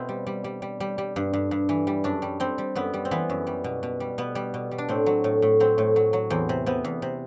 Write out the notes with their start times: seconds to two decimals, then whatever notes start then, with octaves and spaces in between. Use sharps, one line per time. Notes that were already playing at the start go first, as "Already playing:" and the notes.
Already playing: B2 C4 E4
0.09 G3
0.27 G3
0.44 G3
0.62 G3
0.80 G3
0.98 G3
1.16 G2
1.33 G2
1.51 G2
1.69 E3
1.87 G3
2.04 F#2 D4
2.22 G3
2.40 G3 C4
2.58 G3
2.75 F#2 B3
2.93 G3
3.05 C4
3.11 E3 B3
3.29 F#2
3.47 G3
3.64 B2
3.83 B2
4.00 G3
4.18 B2 B3
4.35 G3
4.54 B2
4.71 G3
4.78 D4
4.89 A2 C4
5.06 F#3
5.24 A2
5.42 A2
5.60 F#3 C4
5.78 A2
5.96 F#3
6.13 F#3
6.30 E2 C4
6.49 C3
6.66 C3 B3
6.84 E2
7.02 C3